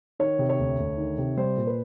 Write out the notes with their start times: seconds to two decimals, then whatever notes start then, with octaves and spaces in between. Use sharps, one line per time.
0.20 D#3 C#5
0.39 C3
0.49 C#5
0.59 D2
0.78 D2
0.98 D#3
1.18 C3
1.37 G3 C5
1.57 A#2
1.67 B4